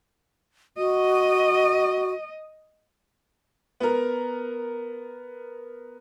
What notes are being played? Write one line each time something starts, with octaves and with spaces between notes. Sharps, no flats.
F#4 D#5
B3 A#4